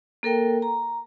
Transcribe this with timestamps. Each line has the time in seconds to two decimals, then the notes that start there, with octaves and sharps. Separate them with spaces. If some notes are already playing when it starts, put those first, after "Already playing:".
0.23 A#3 A4 A#4 G5
0.62 A#5